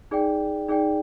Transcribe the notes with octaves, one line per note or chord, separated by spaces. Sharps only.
D#4 G#4 D5 G5
D#4 G#4 D5 G5